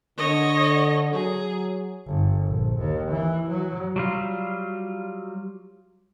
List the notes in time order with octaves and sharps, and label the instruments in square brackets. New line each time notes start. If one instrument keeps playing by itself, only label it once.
[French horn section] D3 [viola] C#5 D#5
[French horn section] F#3 [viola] G#4
[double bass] G1
A#1
D#2
E3
F#3
[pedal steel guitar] F#3 G3 F4